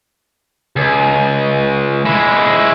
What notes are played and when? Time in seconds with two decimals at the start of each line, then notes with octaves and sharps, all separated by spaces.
0.76 C#2
2.05 G#3 E4